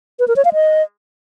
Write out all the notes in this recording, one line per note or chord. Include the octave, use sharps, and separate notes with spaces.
B4
A#4
C#5
F5
D#5